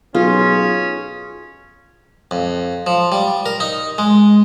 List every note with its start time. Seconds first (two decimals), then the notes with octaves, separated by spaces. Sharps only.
0.15 B1 C#4 F4 G#4
2.31 F2
2.87 F3
3.12 G3
3.46 A#4
3.60 D#4
3.98 G#3